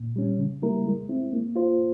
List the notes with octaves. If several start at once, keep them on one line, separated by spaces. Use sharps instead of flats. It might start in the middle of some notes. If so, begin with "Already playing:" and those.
Already playing: A#2
G3 C#4
C#3
G3 A#3 E4 A#4
G#3
C4 E4
A#3
F4 C5